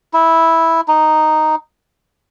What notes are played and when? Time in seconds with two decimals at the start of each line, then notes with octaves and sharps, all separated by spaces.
0.14 E4
0.88 D#4